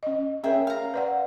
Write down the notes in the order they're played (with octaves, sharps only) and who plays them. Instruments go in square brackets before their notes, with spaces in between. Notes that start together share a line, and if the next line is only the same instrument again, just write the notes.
[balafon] C#4 D#5
[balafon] C#4 A#4 C#5 [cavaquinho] G#4 E5 G5
[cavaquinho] F5 A#5
[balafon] B4 D5 F#5